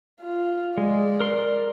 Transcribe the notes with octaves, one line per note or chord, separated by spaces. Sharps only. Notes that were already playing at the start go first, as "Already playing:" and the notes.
F4
G#3 D5
A#4 C6